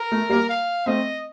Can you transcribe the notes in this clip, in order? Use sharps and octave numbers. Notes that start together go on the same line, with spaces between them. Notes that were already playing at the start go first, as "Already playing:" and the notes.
Already playing: A#4
A3
G3 A#3
F5
A3 C4 D#5